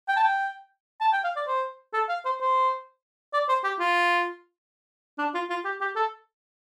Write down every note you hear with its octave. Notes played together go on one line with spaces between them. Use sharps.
G5
A5
G5
A5
G5
F5
D5
C5
A4
F5
C5
C5
D5
C5
G4
F4
D4
F4
F4
G4
G4
A4